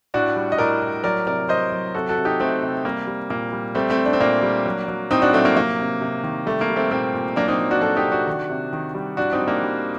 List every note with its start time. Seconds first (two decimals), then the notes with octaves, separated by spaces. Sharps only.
0.14 A2 D4 F#4
0.36 G3
0.52 D#5
0.58 A2 A#4 D5
0.82 A2
1.04 F#3 A#4 D5
1.27 C3 A#4 D5
1.49 F#3 C5 D#5
1.72 F#3
1.94 C3 F#4 A4
2.09 F#4 A4
2.18 C3
2.25 D#4 G4
2.40 C3 A3 C4
2.62 C3
2.85 G3 A#3
3.07 G3
3.30 A#2 A#3
3.53 G3
3.75 G3 A3 C4
3.90 A3 C4
3.98 G3
4.05 D4
4.13 C4
4.20 A#2 A#3 D4
4.43 G3
4.66 F#3
4.88 F#3
5.11 A2 C4 D#4
5.22 D4 F#4
5.33 F#3 A3 C4
5.45 A#3
5.57 C3 A#3
5.79 C3
6.01 C3
6.23 D#3
6.46 G3 A3
6.61 A#3
6.69 G3
6.76 A3 C4
6.91 A#2 A3 C4
7.14 A#2
7.36 F#3 A#3 D4
7.48 C4 D#4
7.59 F#3
7.71 D4 F#4
7.81 F#3 F#4 A4
7.97 D#4 G4
8.05 C3
8.12 D4 F#4
8.27 D#3
8.50 C3
8.73 D#3
8.95 G3
9.17 A2 D4 F#4
9.33 C4 D#4
9.41 G3
9.48 A#3 D4
9.62 G3